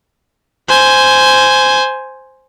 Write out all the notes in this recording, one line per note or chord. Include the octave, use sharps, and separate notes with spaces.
C5 G#5